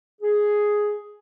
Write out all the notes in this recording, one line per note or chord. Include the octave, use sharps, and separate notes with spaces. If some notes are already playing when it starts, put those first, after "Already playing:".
G#4